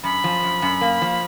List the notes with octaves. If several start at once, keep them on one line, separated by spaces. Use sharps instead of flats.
F#2 B5
F3
F#2
F#2
A#3
F3